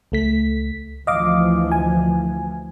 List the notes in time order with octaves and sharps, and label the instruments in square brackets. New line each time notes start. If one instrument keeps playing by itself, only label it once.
[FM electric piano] C#2 A3 B6
[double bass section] D2 E3 F3 [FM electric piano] D#5 F5 D6
[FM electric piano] G#5